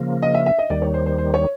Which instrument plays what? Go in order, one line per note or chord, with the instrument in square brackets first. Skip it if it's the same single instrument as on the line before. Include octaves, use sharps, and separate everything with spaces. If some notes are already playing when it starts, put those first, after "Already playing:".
Already playing: [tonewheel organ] C#3 F3 A#3
[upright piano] D#5
E5
E5
D#5
[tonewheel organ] D#2 D#3 G3 [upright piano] D5
[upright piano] C#5
C5
C5
C5
C#5